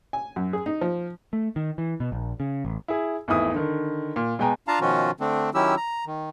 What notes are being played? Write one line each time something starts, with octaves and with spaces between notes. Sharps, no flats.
G#5
F#2
G#4
D#4
F3
A3
D#3
E3
B2
A#1
C#3
A1
E4 G#4
G#1 E2 A3 E4 D#6
D3 D#3
A#2
B2 G#3 G5 G#5 A#5
D4 F4 F5 A5 A#5
B2 D#3 F3 C#4 F4 F#4
D3 A3 C4 D4
D#3 F#3 C#4 E4 G4 E6
A#5
D#3